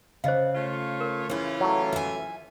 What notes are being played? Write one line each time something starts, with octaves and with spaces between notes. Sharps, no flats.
C#3 C5 D#5 F5
A3 F4 C#5
A#4
C#3 E3 C#4 E4 F4
F#3 A3
E5 G#5